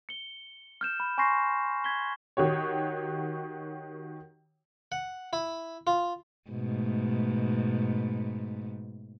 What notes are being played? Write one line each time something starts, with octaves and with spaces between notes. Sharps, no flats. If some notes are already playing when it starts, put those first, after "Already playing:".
C#7 G7
F6 G6 E7
B5
G#5 C6 C#6 G6 A#6 C7
G#6 B6 G7
D#3 F#4 G4 C#5
F#5
E4
F4
G#2 B2 A3